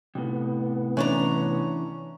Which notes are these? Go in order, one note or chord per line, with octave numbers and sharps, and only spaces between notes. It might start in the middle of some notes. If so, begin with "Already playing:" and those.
A2 C3 B3
E3 C#4 D4 A#5